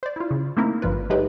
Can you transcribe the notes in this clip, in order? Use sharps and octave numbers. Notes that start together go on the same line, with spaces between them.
C5 D5
E4 F4
C#3
A3 A#3 C4 D#4 E4 A#4
G#1 G2 F3 F4 B4
F#3 G#3 A3 D#4 G4 B4